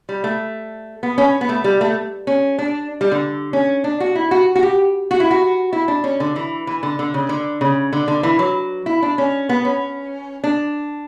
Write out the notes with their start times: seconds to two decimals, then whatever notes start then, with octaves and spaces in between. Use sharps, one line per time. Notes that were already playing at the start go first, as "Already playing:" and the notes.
0.09 G3
0.24 A3
1.03 B3
1.18 C#4
1.41 B3
1.49 A3
1.64 G3
1.81 A3
2.27 C#4
2.59 D4
3.01 G3
3.11 D3
3.53 C#4
3.84 D4
4.00 F#4
4.15 E4
4.31 F#4
4.55 F#4
4.63 G4
5.11 F#4
5.20 E4
5.31 F#4
5.73 E4
5.88 D4
6.04 C#4
6.20 D3
6.36 E3
6.67 E3
6.83 D3
6.99 D3
7.14 C#3
7.29 D3
7.61 C#3
7.93 D3
8.08 D3
8.23 E3
8.39 F#3
8.86 E4
9.02 D4
9.18 C#4
9.49 B3
9.65 C#4
10.44 D4